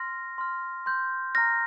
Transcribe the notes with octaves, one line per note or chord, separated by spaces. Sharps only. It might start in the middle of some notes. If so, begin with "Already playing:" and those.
Already playing: C6 F6 A#6
C6 F6
C6 G6
A#5 F6 A#6